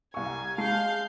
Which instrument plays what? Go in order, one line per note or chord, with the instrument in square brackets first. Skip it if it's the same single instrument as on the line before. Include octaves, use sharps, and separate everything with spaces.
[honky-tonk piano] C2 C#6 [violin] G#5
[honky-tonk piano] G#3 A5 C7 [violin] F5 G6